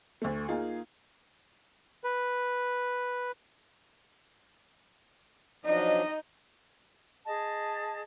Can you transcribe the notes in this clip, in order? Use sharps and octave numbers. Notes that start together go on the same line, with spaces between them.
D2 A3
A#3 D#4 F4 G#4
B4
F3 F#3 D4 D#4 D#5
G#4 D#5 A5